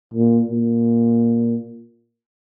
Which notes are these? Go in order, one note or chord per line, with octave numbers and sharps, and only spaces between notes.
A#2
A#2